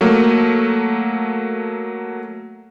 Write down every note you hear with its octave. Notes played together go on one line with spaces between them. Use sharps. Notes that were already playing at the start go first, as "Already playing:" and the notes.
F#3 A3 A#3